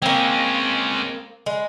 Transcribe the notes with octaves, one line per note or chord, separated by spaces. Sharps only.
G#3 A#3 C4 C#4
G#3